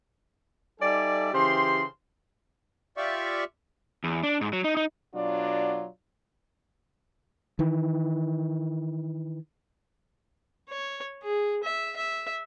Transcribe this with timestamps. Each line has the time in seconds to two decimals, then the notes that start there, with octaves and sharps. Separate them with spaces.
0.81 G3 D#4 A4 D5 E5 G#5
1.33 C#3 E3 G4 C5 C6
2.97 F4 G4 D5 E5 C#6
4.04 E2
4.23 D4
4.41 G#2
4.53 F#3
4.64 D#4
4.77 D#4
5.15 B2 F#3 D4 F4 D5
7.59 D#3 E3
10.69 C#5
11.23 G#4
11.64 E5
11.96 E5